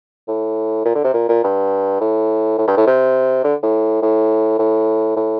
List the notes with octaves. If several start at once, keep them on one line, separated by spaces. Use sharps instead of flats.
A2
A#2
D3
C3
A#2
A#2
G2
A2
A2
G2
A2
C3
D3
A2
A2
A2
A2